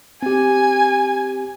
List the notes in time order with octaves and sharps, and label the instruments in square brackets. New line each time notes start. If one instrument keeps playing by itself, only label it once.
[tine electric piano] C4 G4 [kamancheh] G#5